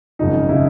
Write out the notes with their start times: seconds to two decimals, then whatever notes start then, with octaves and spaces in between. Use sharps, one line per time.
0.19 G#1 F#2 C#3 F3 D#4
0.49 E4
0.52 C#3 F3